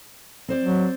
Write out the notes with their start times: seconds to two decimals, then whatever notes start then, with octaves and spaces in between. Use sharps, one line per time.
0.49 C4 C5 D5
0.62 F#3